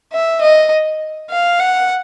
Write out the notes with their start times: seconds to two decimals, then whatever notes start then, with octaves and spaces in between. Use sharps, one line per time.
0.13 E5
0.41 D#5
1.30 F5
1.59 F#5